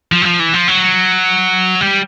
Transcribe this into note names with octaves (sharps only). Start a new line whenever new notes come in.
F3
F#3
F3
E3
F3
F#3
G3